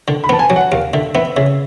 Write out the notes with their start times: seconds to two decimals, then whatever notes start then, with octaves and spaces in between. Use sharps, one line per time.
0.08 D3
0.24 B5
0.29 B3 A5
0.39 G#5
0.50 F#3
0.56 F#5
0.72 D#2 F5
0.94 D3 E5
1.15 B3 E5
1.36 C#3 E5